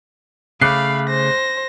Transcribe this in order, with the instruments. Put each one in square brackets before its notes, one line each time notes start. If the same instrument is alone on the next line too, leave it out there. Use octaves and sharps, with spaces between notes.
[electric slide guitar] C#3 A3 [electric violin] F5 [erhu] B5 [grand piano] D6 F#6 C7
[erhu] C5 [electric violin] A#6